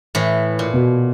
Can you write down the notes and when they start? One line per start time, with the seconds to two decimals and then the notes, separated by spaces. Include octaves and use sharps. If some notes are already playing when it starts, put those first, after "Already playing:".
0.15 A2 E3
0.59 A#2
0.74 B2